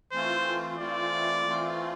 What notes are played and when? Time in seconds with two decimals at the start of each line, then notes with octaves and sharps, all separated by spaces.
0.12 E3 A3 C4 F4 C5
0.78 E3 A3 C4 F4 D5
1.46 E3 A3 C4 F4